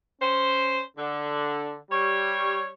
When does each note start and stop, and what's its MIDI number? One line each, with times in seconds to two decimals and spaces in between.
0.21 0.81 61
0.21 0.81 72
0.97 1.75 50
1.91 2.67 55
1.91 2.67 73